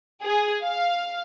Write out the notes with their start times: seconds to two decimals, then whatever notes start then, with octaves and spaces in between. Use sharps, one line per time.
0.24 G#4
0.63 F5